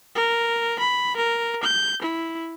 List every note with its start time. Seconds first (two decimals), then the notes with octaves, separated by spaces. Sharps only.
0.16 A#4
0.79 B5
1.17 A#4
1.63 G6
2.02 E4